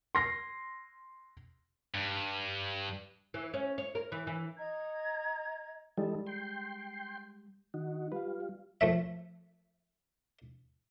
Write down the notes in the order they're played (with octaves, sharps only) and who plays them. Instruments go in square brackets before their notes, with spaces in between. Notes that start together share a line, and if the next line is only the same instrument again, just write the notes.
[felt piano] C6 A#6 C7
[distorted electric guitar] G2
[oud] E3
C#4
C#5
A#4
E3
E3
[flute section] D#5 A#5 G#6
[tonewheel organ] E3 D#4 A4 [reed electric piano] G3 G#3
[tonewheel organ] G5 C6
[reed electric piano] D#3 [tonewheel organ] D#4 F#4
[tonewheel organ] G3 F4 [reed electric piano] B4 F5
[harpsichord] F3 A3 E5